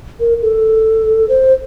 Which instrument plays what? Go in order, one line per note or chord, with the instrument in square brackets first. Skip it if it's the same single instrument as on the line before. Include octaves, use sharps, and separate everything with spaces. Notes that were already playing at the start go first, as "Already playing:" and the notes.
[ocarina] A#4
A4
C5